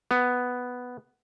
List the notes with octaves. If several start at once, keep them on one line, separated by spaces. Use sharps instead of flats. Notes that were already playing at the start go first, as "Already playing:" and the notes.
B3